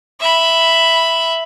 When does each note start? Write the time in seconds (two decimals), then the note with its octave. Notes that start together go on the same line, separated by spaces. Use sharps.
0.20 E5 B5